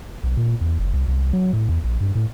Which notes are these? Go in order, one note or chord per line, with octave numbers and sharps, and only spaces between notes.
B1
A#2
E2
F#1
C2
C2
F#3
A2
E2
A#1
G2
A2